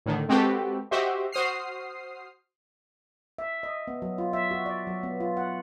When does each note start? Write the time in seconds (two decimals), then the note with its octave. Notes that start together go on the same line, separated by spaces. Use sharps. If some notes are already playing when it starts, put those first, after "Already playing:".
0.06 A2 D3 D#3
0.29 G#3 C4 F#4 G4 A4 B4
0.91 F#4 G4 C5 D#5 E5
1.32 F#4 C5 D#6 F6 C7
3.38 E5
3.63 D#5
3.88 B3
4.02 F#3
4.18 F4
4.33 E5
4.51 F#4
4.66 D5
4.87 F#3
5.03 B3
5.20 F4
5.37 F#5